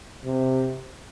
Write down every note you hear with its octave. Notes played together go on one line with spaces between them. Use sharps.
C3